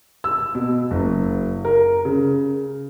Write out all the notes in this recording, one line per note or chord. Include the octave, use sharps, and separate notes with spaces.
E6
B2
F#1
A#4
C#3